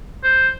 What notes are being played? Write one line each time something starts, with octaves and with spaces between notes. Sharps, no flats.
C5